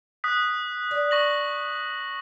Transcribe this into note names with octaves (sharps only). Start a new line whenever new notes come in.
D#6 F#6 B6
D5
C#6 A#6 F#7